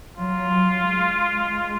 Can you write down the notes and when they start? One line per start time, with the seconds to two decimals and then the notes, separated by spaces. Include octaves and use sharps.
0.18 F#3 F4
0.51 F#3
0.84 G#3